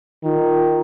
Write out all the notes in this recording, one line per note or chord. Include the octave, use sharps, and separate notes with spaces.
D#3 F4